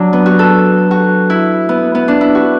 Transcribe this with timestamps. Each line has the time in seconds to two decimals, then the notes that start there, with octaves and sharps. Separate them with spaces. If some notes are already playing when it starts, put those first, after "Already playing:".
Already playing: F#3 D4
0.13 B3
0.26 F#4
0.39 A4
0.91 F#4
1.30 E4
1.69 B3
1.95 B3
2.08 D4
2.21 E4
2.35 F#4